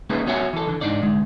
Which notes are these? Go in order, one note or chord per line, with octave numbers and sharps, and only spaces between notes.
A3 A#3 C#4 D#4 G#4 B4
B3 F#4 C#5 E5 F#5 G#5
E3 A4
D3 E3
G#2 D4 D#4 D5
D2 G#3